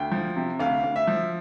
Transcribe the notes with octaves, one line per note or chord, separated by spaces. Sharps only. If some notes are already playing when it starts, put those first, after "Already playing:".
Already playing: D2 G5
F3
C3
D2 F5
D2
E5
F3